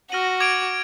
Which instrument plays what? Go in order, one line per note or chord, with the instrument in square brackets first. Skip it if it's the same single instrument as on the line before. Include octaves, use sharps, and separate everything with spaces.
[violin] F#4 [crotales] F6 A#6 D#7 F#7
[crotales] D6 G#6 D7 F7